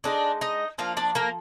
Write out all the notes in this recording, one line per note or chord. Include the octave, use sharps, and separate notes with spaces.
D3 G#3 D4 D#4 D5
D#4 D#5
F3 A#3 D4 F4 F5
D4 D5
A#3 A#4